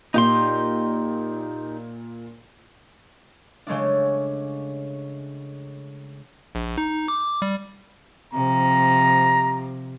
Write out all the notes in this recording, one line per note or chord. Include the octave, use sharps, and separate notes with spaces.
A#2 D#4 G4 C6
C#3 G#3 A3 D4
A#1
D#4
D6
G3
C3 F3 A#5